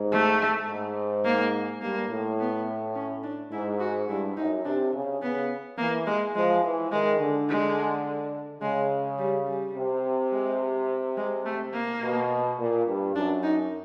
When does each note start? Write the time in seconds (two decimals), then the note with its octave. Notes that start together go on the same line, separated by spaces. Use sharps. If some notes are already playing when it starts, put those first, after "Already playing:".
Already playing: G#2
0.12 A3
0.68 G#2
1.25 A#3
1.81 G2 A#3
2.10 A2
2.39 B3
2.95 C#4
3.24 D4
3.52 G#2 E4
3.80 F#4
4.09 G2 E4
4.37 F#2 D#4
4.65 C3 D4
4.94 C#3
5.22 C#3 B3
5.78 E3 A#3
6.07 G#3
6.35 F3 G#3
6.64 E3
6.91 D#3 G#3
7.20 D3
7.49 G#3
8.62 C#3 G#3
9.19 G3
9.47 G3
9.74 C3
10.32 G#3
11.17 G#3
11.46 A3
11.74 A#3
12.02 B2
12.58 A#2
12.86 G2
13.15 F#2 D4
13.43 D#4